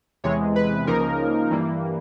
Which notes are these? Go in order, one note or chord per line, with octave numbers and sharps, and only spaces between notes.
E2 C3 E3 G#3 C#5
B4
C#2 C#3 F3 A#3 D#4 A#4
G2 E3 G3 A#3